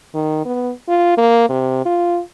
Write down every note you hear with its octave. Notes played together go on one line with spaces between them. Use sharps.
D#3
B3
F4
A#3
C3
F4